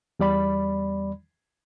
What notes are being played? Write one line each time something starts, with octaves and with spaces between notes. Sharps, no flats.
E2 G3 D5 B5